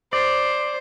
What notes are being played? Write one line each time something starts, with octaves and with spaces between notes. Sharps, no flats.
C5 D5